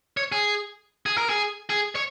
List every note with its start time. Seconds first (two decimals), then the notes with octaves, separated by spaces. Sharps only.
0.17 C#5
0.32 G#4
1.06 G#4
1.18 A#4
1.30 G#4
1.70 G#4
1.95 C#5